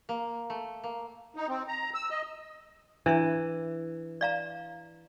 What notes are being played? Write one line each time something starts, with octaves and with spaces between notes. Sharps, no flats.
A#3
A3
A#3
D#4
C4
A#5
E6
D#5
E3 D4 E4 E5
D5 F5 A#5